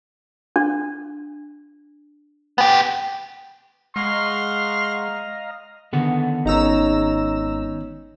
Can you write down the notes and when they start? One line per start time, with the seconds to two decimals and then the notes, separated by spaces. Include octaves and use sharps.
0.56 D4
2.58 B3 G4
3.96 G#3 D#5 F5 F#5 A#5 C6 C#6 F6
5.93 D3 D#3 B3 F#5
6.45 G#1 C#4 D#4 A#5 E6